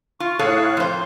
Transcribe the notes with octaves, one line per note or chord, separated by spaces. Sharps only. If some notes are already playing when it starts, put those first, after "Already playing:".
F4 C#6
A2 G#4 A4 C#5 F5 F#6
F2 C5